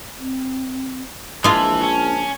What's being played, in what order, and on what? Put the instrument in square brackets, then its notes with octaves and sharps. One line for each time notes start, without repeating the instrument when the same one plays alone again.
[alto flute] C4
[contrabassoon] A#1 [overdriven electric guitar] E3 [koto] G#3 F4 [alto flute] A5
[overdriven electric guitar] C#4